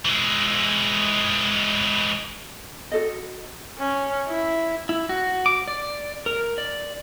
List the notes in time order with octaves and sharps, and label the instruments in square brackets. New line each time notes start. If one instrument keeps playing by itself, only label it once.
[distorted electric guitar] E3 G#3
[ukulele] F#4 A4 D#5
[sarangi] C#4
E4
[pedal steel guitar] E4
F#4
D6
D5
A#4
D5